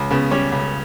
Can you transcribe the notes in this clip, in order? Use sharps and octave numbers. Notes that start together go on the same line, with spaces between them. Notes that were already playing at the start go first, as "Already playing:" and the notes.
Already playing: C#2
C#3 B3
G3 C#4
C#2